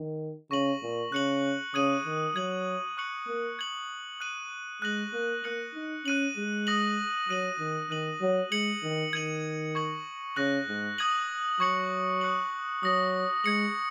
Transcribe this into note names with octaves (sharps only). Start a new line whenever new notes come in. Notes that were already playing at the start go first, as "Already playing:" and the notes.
Already playing: D#3
C#3 C#6 A#6 D#7 F#7
A#2
C#3 F#6 C#7 F#7
C#3 D#6 G#6 D#7 F#7
D#3
F#3 G#6 F#7
C#6 F#6 C#7 F#7
A#3
G#6 F#7
F#6 D#7 F#7
G#3 F#6 A#6 F#7
A#3
A#3 F#6 C#7 F#7
D#4
C#4 F#6 D#7 F#7
G#3
D#6 A#6 F#7
F#3 F#6 D#7 F#7
D#3
D#3 F#6 D#7 F#7
F#3
G#3 G#6 C#7 F#7
D#3
D#3 G#6 D#7 F#7
C#6 G#6 C#7 F#7
C#3 C#6 F#6 A#6 F#7
G#2
D#6 G#6 D#7 F#7
F#3 C#6 G#6 C#7 F#7
D#6 F#6 C#7 F#7
F#3 D#6 A#6 F#7
G#3 G#6 C#7 F#7